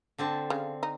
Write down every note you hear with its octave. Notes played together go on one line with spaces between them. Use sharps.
D3 C4 A5
C#3
D#4